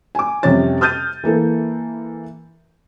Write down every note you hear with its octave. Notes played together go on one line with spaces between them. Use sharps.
G#5 D6
F2 C3 G3 C#4 C#5 A6
D#6 F6 G6 A6 D#7
E3 A#3 A4 B4